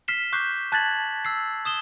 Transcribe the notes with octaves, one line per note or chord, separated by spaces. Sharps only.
F6 B6 C7 E7 G7
C#6 D6 F#6 G6 C7
A5 F#6 G#6 A6 B6 F#7
E6 C7
D#6 E7 G7